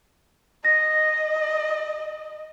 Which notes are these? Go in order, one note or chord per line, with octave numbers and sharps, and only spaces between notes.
D#5 A#6